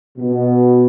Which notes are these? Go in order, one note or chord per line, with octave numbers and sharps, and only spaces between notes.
B2